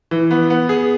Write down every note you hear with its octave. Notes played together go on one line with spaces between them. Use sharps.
E3
B3
B3
G#4